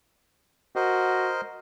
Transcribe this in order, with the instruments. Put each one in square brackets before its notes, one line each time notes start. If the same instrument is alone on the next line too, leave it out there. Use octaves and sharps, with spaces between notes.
[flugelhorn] F#4 [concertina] A#4 C5 D#5